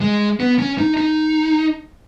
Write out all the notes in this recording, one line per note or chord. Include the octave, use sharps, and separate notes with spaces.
G#3
B3
C#4
D#4
D#4